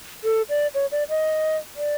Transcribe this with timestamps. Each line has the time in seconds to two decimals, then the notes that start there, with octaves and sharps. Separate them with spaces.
0.24 A4
0.49 D5
0.74 C#5
0.92 D5
1.09 D#5
1.76 D5